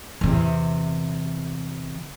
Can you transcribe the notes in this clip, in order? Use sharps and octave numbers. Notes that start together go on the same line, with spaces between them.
E2 C3